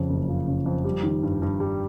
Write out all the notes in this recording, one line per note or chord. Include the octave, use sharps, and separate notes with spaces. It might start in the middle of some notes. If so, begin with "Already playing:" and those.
Already playing: F2 C#3
F#1
F3
C#3
F2
G3
D#3
G2
G2
G3